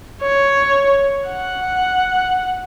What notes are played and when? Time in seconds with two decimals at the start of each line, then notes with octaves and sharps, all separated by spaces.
0.22 C#5
1.30 F#5